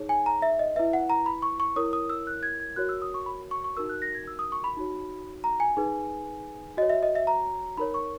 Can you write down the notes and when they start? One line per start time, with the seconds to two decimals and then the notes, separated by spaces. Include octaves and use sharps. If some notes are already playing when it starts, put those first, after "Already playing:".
Already playing: D#4 G#4 C#5
0.09 G#5
0.26 A#5
0.42 E5
0.59 D#5
0.76 E4 B4 E5
0.93 F#5
1.10 A#5
1.26 B5
1.42 C#6
1.60 C#6
1.76 E4 A#4 C#5 D#6
1.93 D#6
2.10 E6
2.27 F#6
2.43 G#6
2.60 G#6
2.76 F#4 A#4 C#5 F#6
2.89 E6
3.02 D#6
3.14 C#6
3.26 B5
3.51 C#6
3.64 C#6
3.77 D#4 F#4 A#4 E6
3.89 F#6
4.02 A#6
4.15 G#6
4.28 E6
4.39 D#6
4.52 C#6
4.64 B5
4.77 D#4 F#4 C#5
5.44 A#5
5.60 G#5
5.77 D#4 G#4 B4
6.77 F#4 C#5 D#5
6.90 E5
7.03 D#5
7.15 E5
7.27 A#5
7.77 D#4 A#4 C#5 B5
7.94 C#6